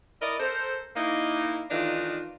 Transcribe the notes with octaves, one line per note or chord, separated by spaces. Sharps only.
E4 A#4 D5 D#5
A4 A#4 C5
A#3 D#4 E4
D#3 E3 A3 D4 D#4 F4